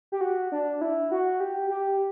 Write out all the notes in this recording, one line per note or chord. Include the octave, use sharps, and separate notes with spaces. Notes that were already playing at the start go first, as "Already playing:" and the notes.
G4
F#4
D4
E4
F#4
G4
G4